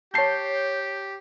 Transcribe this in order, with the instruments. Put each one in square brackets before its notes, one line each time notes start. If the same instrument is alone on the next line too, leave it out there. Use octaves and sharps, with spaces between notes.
[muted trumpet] G4 [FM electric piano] C#5 G6 [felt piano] A5 C7